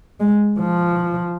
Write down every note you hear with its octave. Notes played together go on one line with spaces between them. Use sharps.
G#3
F3